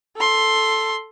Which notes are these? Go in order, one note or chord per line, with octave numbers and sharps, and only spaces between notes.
A4 C6